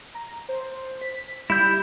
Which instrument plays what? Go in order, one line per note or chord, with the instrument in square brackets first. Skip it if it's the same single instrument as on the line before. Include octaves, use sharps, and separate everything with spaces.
[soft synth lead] A#5
C5
B6
[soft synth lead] G3 [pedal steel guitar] E4 G6